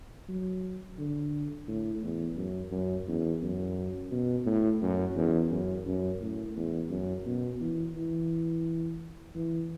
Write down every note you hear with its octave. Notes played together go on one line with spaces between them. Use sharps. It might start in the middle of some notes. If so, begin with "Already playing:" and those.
F#3
D3
A2
E2
F#2
F#2
E2
F#2
B2
A2
F#2
E2
F#2
F#2
A2
E2
F#2
B2
E3
E3
E3